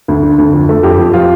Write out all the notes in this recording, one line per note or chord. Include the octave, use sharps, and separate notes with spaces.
D2
D3
D2
F2
A3
F2 G4
F2
F3 F4